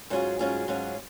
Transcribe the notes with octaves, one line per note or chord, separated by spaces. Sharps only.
G#2 F#3 C#4 F4 G#4
G#2 F#3 C#4 F4 G#4
G#2 F#3 C#4 F4 G#4